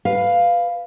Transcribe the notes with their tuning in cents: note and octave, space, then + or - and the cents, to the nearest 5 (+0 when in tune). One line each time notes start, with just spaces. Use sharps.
B4 +0 F5 +0